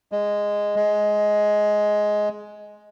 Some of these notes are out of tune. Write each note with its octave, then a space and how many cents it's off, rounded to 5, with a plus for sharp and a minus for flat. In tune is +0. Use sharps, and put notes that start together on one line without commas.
G#3 -10
G#3 +10